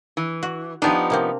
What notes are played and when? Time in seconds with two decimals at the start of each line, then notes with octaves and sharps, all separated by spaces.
0.17 E3
0.43 F#4
0.82 F3 B3 D4 D#4 G4
1.10 C3 A#3 C4